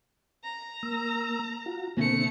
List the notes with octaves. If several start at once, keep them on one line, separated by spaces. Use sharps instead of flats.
A#5
A#3 E6
F4 F#4
B2 D3 A3 A#3 C4 C#7